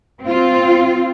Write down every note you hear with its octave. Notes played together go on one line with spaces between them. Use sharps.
C4 F4